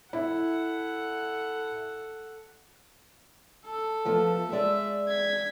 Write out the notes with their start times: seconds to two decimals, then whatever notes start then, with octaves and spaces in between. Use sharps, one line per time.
0.13 E4 A4 F#5
3.66 A4
4.05 F3 A3 B3
4.52 G#3 D5 E5
5.09 G#6 B6